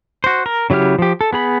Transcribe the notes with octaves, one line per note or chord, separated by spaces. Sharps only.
F#4 C5
A#4
C#3 F#3 E4 G4 F6
F3 G4
A4
B3 G#4 B5